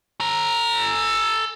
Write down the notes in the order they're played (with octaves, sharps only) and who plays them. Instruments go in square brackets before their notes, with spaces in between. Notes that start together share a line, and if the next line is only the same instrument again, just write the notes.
[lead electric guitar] A4 A#5